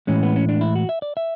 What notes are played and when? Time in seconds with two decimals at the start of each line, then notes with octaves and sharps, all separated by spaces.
0.07 A2 E3 G#3 C#4
0.23 B3
0.36 C#4
0.49 D4
0.61 E4
0.75 F#4
0.89 E5
1.02 D5
1.17 E5